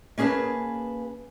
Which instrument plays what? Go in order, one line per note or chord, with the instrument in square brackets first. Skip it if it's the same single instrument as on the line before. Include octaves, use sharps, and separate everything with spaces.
[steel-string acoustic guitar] A#3 C#4 G#4 B4 A5